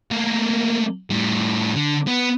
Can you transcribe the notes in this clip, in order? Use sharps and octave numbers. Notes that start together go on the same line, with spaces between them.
A3 A#3
A2 G3
D3
B3